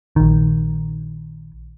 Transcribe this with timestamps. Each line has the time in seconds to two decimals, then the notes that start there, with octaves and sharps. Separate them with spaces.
0.16 A#1 D#3